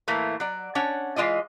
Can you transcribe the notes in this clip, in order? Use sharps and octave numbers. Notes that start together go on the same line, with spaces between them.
A2 E3 A3 A#3
F#3 D5
C#4 D4 C#5 F#5
E3 G#3 F4 D5 D#5